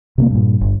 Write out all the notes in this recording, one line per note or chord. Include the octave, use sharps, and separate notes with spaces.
C3 A3 A#3
G2 A#2
G1